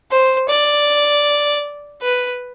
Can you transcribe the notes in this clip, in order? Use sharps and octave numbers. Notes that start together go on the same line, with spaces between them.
C5
D5
B4